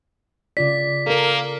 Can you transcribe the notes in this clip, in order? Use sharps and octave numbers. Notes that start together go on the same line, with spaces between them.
C#3 F4 D5 B6
A#3 A4 A#4